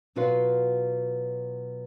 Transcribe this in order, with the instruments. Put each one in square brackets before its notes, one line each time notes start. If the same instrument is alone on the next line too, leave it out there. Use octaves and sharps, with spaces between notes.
[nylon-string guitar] B2 F#3 F4 F#4 B4 F5